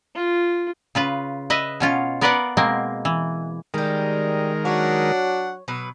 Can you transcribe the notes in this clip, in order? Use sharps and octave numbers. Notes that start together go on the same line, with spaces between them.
F4
C#3 F4 B4
B4 D#5 E5
B2 C#4 F4
B3 A#4 B4 D5 F5 F#5
B2 G#3 A#3 C4
E3
D#3 G3 G#3 G4 A#4
F#3 D4 C#5 F#5
B2 F#3 B4